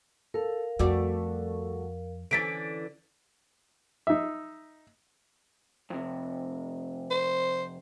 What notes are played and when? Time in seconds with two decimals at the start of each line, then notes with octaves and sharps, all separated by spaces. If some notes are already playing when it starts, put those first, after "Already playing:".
0.34 A4 A#4 F5
0.79 F2 G3 A3 F#4 D5
2.31 D3 E3 C#4 A6 B6 D7
4.07 D#4 E5
5.90 F2 C3
7.11 C5